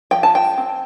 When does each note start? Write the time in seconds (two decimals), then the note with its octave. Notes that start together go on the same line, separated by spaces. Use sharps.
0.11 F3 G5
0.23 A5
0.35 G5
0.58 C4